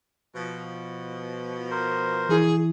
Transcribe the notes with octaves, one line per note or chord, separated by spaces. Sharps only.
B2 F3
A#4 C5
E3 E4 G#4